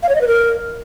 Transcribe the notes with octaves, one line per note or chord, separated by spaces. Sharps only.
F5
C#5
D#5
B4
A#4